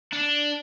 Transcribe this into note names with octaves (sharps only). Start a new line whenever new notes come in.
D4